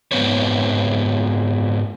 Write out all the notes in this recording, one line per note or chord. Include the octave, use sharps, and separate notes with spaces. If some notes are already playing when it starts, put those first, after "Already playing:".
G#2 E3 B3 C4 B4 C#5